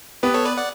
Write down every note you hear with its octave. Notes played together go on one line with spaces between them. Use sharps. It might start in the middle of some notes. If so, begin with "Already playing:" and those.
B3 G4 B4
A4 C#5
B4 D5
D5 F#5